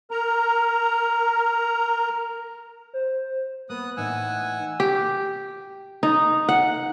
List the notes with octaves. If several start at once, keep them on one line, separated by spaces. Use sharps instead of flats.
A#4 A#5
C5
A#3 B3 D#6 F#6
A2 E3 D#4 F#5 G#5 E6
G4
D#4
F#5